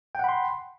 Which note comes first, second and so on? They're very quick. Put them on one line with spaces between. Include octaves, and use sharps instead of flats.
G5 F#5 B5 C6